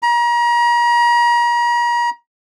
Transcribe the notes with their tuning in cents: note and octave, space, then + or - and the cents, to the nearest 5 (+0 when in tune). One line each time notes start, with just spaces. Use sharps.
A#5 +35